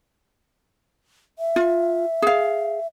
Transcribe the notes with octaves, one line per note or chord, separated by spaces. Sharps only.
E5
F4
G#4 F5